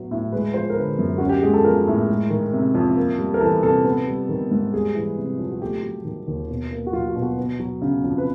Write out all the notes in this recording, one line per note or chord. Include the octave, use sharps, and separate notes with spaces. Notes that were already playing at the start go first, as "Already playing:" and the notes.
Already playing: A2 F#3 B3
A2
G#3 B4
F3 C5
A#4
D3 B4
F#2
C#4 F#4
G4
G#3 G#4
A4
F3 A#4
A2
G#3
D#3
C3
F2
A#3
G3
A#4
E3 A4
C3 A4
B3
G3
D#3
G#2
G3 G#4
E3
C3
F2
F#4
A3 G4
F#3
D#3
D#2
B2
A#3
F#4
F#3 F4
F#4
B2
F#4
B3
F#3
C#3
F2
B4